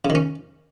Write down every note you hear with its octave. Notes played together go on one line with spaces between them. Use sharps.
C#3
D#3
C#4